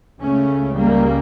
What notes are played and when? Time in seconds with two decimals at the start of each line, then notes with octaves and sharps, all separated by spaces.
0.21 C#2 C#3 A3 C#4
0.76 G3 A#3